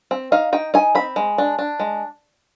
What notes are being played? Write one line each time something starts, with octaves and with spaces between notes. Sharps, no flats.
C4
D#4 F5
D#4 G5
D#4 G#5
C4 B5
G#3
D4
D4
G#3